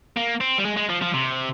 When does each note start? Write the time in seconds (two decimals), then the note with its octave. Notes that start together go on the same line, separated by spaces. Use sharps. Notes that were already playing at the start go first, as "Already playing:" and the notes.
0.17 A#3
0.41 C4
0.58 G3
0.65 G#3
0.77 G#3
0.89 F3
1.01 F3
1.13 C3